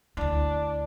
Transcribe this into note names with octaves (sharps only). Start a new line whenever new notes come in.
D2 D4 E4